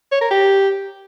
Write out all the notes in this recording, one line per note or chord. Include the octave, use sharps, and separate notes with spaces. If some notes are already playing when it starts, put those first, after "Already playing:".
C#5
A#4
G4